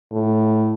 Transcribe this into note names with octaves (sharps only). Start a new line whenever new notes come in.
A2